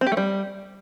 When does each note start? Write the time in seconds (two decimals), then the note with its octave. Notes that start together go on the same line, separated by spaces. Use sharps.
0.01 C4
0.07 G4
0.12 A3
0.17 G3